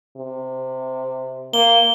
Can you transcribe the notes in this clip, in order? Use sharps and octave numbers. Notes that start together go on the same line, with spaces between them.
C3
A#3 G7